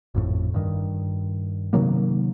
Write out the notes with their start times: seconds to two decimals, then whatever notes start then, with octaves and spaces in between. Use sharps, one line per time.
0.15 G#1 F2 A2
0.54 G2 D#3
1.73 C3 D#3 F#3 A#3